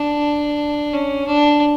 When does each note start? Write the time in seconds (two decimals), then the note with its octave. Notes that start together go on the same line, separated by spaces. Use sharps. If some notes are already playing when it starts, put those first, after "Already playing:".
Already playing: D4
0.94 C#4
1.27 D4